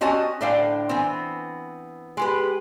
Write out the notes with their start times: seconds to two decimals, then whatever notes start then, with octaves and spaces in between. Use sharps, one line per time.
0.01 C4 C#4 F#4 D#5 A5
0.41 A2 D3 D4 C5 F5 G5
0.89 E3 B3 C4
2.17 G#3 G4 B4